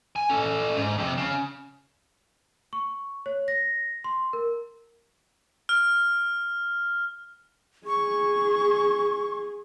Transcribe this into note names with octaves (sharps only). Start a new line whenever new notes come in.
G#5
C#4 A4
G#2
F2 C3
C#3
C#6
C#5
A#6
C6
A#4
F6
G#4 C#6